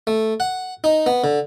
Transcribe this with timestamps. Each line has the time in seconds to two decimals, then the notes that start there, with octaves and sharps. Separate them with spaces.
0.07 A3
0.40 F#5
0.84 D#4
1.06 B3
1.24 D3